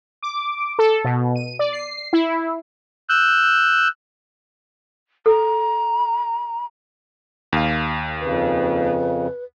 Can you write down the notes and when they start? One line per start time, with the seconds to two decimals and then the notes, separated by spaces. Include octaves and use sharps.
0.23 D6
0.79 A4
1.04 B2
1.36 D#7
1.59 D5
1.73 C7
2.13 E4
3.09 E6 F#6 G6
5.26 A4 A#5
7.53 D#2 F5
8.20 F2 C#3 B4